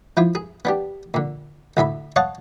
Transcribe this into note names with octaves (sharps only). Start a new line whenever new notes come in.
F3 E4 F4
G#4
B3 D4 G4
A#2 D3
D2 A2 E5 B5
C#5 D#5 F5 F#5 A5